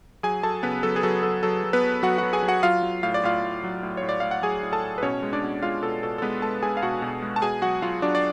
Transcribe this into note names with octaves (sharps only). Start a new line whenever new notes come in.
F#3 G#4 G#5
F#3 A4 A5
C#3 B3 B4
F#3 A4
G#4
F#3 A4
F#3 A4
F#3 A4
F#3
B3 B4
F#3
F#3 F#4 F#5
F#3 F#4 F#5
G#4 G#5
F#3
F#4 F#5
F#3 F4 F5
F#3
A2 F5
D5
A2 F4 F5
A2
F#3
A2
A2 C#5
D5
A2 F5
F#5
F#3 G#4 G#5
A2
A4 A5
A2
B4
B2 C#4 C#5
G#3
D4 D5
B2
G#3 F4 F5
B2 A4
B2 A4
A4
G#3 B3 B4
G#3 A4 A5
G#3 G#4 G#5
F5
B2 F#4 F#5
B2
G#3
A5
B2 G#4 G#5
F#3 F#4 F#5
F#3 F4 F5
F#3 D4 D5
D5